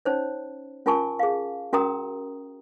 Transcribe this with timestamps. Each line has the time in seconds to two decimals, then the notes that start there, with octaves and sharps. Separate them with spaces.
0.05 C#4 D#4 C5 C#5
0.86 C#4 F4 A#4 G#5 A5 C#6
1.19 G#4 F5
1.73 C#4 F#4 A#4 G5 A#5 D#6